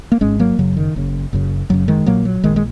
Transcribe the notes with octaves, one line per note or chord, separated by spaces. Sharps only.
A#3
G#1 G#2 G#3 C#4
F#3 A#3
F#1 F#2 C#3 F#3
D#3
F#1 F#2 C#3
F#1 F#2 C#3
F#1 F#2 C#3 F#3
D#3 G#3
A#1 A#2 F#3 A#3
F#3
A#1 A#2 D#3 G#3
G#3